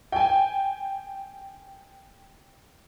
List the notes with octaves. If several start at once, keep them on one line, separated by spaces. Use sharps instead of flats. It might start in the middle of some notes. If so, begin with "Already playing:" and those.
G5 G#5